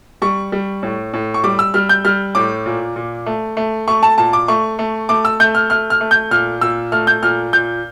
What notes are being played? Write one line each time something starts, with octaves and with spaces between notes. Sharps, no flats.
G3 C#6
G3
A2
A2
C#6
G3 D6
E6
G3 F6
G6
G3 F6
A2 D6
A#2
A#2
A3
A3
A3 C#6
A5
A#2 A5
D6
A3 C#6
A3
A3 D6
E6
A3 G6
F6
A3 F6
F6
A3
G6
A#2 F6
A#2 E6
A3 F6
G6
A#2 F6
A#2 G6